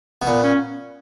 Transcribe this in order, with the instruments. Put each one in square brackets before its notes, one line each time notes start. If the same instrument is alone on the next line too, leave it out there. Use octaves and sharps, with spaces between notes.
[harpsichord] B2
[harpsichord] A#2 [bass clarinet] B3
[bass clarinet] C#4